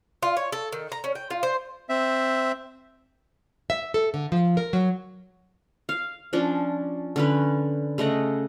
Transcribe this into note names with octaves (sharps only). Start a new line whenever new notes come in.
F4
C#5
A4
D#3
A#5
C#4
G5
F4
C5
C4 E5
E5
A4
D3
F3
A#4
F#3
F5
F3 C#4 D4
D3 C#4 B4
C#3 A3 D#5 F#5